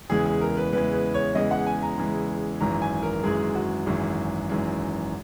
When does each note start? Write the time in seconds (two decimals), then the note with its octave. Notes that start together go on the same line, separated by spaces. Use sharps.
0.10 E2 C#3 E3 G#3 G#4
0.26 G#4
0.41 A#4
0.57 B4
0.73 E2 C#3 E3 G#3 B4
0.93 B4
1.14 C#5
1.35 E2 C#3 E3 G#3 D#5
1.51 F#5
1.66 G#5
1.82 A#5
1.98 E2 C#3 E3 G#3
2.61 G#1 F#2 E3 G#3 A#5
2.82 G#5
3.03 A#4
3.23 G#1 F#2 E3 G#3 G#4
3.55 F#4
3.86 G#1 F#2 E3 G#3
4.50 G#1 F#2 E3 G#3